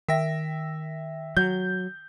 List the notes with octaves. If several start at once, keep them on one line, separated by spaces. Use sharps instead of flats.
D#3 E5 G5 A#6
F#3 G6